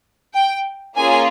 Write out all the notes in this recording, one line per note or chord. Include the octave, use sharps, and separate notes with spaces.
G5
A#3 C#4 F4 G#4 G#5